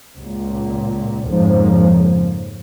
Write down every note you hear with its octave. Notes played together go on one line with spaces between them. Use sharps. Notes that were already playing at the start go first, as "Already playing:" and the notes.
C#2 A#2
F2 G#2 C#3 F3 A#3